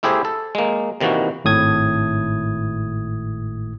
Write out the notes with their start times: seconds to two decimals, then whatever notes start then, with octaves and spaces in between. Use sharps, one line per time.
0.03 A3 E4 G4 G#4 C5
0.25 A4
0.55 G#3 A#3
1.01 C3 D#3 E3 A#3 F#4
1.45 G#1 A2 D#6 G#6